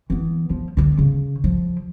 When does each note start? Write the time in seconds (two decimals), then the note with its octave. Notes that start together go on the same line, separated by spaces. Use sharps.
0.10 E3 B3
0.50 F3
0.77 D3 B3
0.99 C#3
1.44 F3